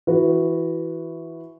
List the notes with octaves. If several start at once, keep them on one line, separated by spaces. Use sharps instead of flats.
E3 F#4 B4